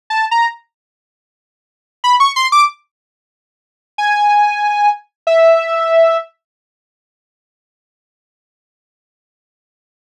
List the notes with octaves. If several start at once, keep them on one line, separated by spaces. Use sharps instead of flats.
A5
A#5
B5
C#6
C6
D6
G#5
E5